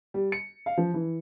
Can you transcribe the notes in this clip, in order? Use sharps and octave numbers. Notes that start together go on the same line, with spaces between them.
G3
C#7
F5
F3
E3